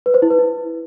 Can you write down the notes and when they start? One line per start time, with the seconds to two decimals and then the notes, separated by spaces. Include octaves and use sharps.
0.06 B4
0.14 C5
0.22 E4
0.31 B4
0.39 E4